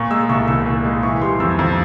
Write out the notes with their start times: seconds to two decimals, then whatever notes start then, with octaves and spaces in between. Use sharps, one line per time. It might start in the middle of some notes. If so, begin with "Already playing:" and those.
Already playing: A#2 C#6
0.11 G#3 E6
0.29 C2 C#6
0.48 C2 E6
0.66 A#2
0.84 G#3
1.03 E3 C#6
1.21 G3 C6
1.40 F2 E6
1.59 F2